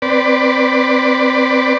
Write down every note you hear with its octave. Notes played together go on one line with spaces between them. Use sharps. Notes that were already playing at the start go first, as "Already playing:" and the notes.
C4 B4 D5